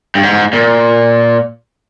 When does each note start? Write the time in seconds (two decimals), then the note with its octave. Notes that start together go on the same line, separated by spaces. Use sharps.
0.15 G2
0.23 G#2
0.53 A#2